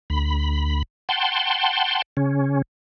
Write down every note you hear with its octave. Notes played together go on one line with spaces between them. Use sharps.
D2 B5
F#5 G5 A5 C6
C#3 C#4